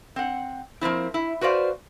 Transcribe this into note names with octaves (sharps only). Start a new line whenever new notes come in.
C4 F#5
F3 A#3 C4 E4
E4
F#4 B4 C5 D5 F5